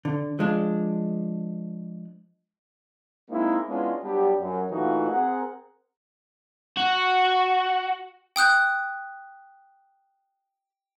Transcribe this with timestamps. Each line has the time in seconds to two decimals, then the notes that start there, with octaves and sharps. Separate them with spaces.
0.05 D3
0.39 F3 G#3 D4
3.29 G#3 A#3 C4 D#4 E4
3.68 G#3 B3 C#4 D4 E4 F4
4.02 F#3 G3 B3 D4 G4
4.38 F#2
4.70 A#2 E3 A3 D#4 F4 F#4
5.10 C4 G#4 A#4 F#5
6.77 F#4
8.36 G5 D#6 F#6 G6